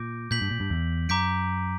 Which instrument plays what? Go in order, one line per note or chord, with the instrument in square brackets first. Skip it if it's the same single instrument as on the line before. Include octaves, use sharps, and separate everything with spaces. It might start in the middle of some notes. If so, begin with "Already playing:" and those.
Already playing: [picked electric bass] A#2 [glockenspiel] D6 G6 A#6 D7
[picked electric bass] A#2 [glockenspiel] G6 B6 F#7
[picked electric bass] G2
A#2
G2
E2
[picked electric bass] F#2 [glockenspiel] A#5 D6 G6 B6 D7